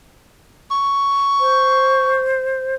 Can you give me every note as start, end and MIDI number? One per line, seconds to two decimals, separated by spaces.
0.71 2.22 85
1.40 2.75 72